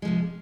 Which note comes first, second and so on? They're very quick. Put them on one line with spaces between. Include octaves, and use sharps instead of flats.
G#3 F3 C3